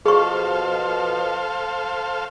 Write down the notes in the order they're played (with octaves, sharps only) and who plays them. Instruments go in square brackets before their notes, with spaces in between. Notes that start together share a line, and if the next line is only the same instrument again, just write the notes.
[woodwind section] B2 F3 [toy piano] G#4 C#6 [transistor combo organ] A4 C5 F5